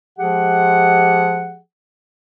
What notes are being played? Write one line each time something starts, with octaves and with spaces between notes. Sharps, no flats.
F3 G#3 G4 G#4 F#5